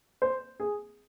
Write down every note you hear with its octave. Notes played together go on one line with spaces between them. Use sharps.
C5
G#4